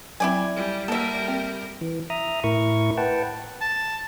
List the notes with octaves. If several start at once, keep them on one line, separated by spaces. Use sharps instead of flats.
F#3 C4 E4 D5 G#5
G3
G3 A#3 A4 A#4 E5
C4
E3
E5 A#5 D#6
A2 E4 A#4 C#6
B4 F#5 G5 A5
A5